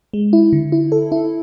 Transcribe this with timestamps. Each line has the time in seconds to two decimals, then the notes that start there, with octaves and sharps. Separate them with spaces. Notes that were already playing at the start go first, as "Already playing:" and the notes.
0.14 G#3
0.33 E4
0.53 D3
0.72 E4
0.92 A4
1.12 E4